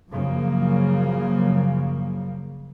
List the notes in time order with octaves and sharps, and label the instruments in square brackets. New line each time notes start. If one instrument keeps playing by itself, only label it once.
[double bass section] F#2 C#3 F3 A#3